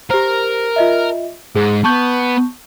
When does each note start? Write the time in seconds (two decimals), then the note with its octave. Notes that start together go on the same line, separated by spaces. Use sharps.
0.10 G4 A#4 C5
0.76 F4 D#5 E5
1.55 G#2 G#4
1.84 B3 A5 C#6 G6